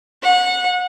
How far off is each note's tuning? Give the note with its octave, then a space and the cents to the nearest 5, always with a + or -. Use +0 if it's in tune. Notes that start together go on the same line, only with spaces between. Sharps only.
F#5 -25